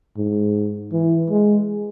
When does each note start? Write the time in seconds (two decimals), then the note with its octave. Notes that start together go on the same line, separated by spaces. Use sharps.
0.17 G#2
0.92 E3
1.30 G#3